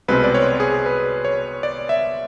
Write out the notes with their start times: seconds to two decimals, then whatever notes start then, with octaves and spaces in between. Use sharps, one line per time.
0.08 C2 B2 G#3 C4 B4
0.24 D5
0.35 C#5
0.60 G#4
0.86 B4
1.25 C#5
1.63 D5
1.89 E5